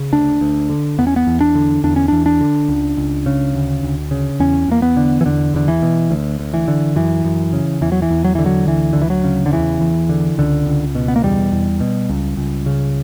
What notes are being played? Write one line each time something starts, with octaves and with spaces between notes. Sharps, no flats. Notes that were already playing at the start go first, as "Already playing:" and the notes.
Already playing: C#3
D2 D4
D2
D3
E2 B3
C#4
B3
E2
D4
D3
E2 D4
C#4
E2 D4
D4
D3
C#2
C#2
C#3
D2
D2
C#3
E2 C#4
E2 A#3
B3
D3
E3
E2 D3
E2 D3
E3
B2
D2
D2
E3
D3
F#2 E3
F#2
C#3
E2 E3
F#3
E3
E2
F#3
D3 E3
F#3
D2 E3
D2 D3
E3
F#3
C#3
D3
E2 E3
E2
D3
C#2 D3
C#2
B2
B3
A#3
E2 G3
E2
B2
C#2
C#2
C#3